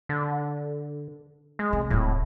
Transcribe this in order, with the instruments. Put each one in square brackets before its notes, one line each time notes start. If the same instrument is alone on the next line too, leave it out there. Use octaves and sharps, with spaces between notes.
[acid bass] D3
G#3
[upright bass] C3
[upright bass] D1 C3 [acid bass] A2